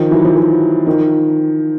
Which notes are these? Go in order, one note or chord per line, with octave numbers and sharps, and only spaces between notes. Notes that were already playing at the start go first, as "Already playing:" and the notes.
Already playing: D#3 F3
E3 F#3
F3
E3 F#3
D#3 F3